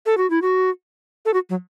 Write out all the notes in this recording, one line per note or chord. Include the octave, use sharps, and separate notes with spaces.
A4
F#4
E4
F#4
A4
F#4
F#3